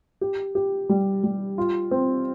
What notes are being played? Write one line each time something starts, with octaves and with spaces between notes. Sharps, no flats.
G4
G4
G3
G3
F4
C4